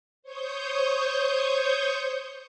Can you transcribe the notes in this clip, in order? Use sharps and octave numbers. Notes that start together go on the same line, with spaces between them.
C5 C#5 C#6 D#6 G6